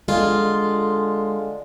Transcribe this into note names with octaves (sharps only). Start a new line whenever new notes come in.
D3 G#3 F4